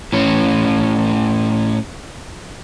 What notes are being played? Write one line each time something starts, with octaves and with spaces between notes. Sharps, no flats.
A2 C#4